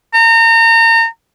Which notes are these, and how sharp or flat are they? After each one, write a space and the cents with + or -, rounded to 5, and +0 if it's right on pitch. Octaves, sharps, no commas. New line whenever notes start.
A#5 -35